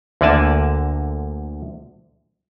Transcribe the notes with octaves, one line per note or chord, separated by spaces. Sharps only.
D2 D3 A#3 D5 G#5 A5